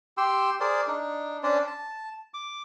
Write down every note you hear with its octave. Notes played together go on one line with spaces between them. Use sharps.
G4 G5 C6 E6
G#4 A#4 C5 D5
D4 D#4
C#4 D4 C5 D5
A5
D6